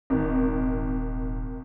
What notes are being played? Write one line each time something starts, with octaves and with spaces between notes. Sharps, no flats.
D#1 G#1 D#3